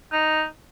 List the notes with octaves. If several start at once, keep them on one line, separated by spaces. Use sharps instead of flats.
D#4